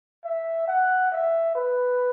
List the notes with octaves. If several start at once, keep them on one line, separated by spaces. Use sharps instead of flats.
E5
F#5
E5
B4